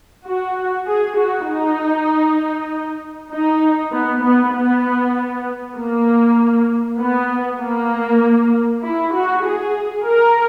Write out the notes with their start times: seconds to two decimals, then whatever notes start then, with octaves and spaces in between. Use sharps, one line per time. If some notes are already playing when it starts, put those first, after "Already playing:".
0.25 F#4
0.86 G#4
1.17 F#4
1.47 D#4
3.31 D#4
3.92 B3
4.23 B3
4.53 B3
5.76 A#3
6.98 B3
7.61 A#3
8.83 E4
9.13 F#4
9.44 G#4
10.05 A#4